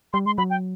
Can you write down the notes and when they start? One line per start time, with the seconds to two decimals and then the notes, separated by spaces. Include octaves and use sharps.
0.13 G3 C6
0.26 G#3 C6
0.38 F#3 B5
0.50 G5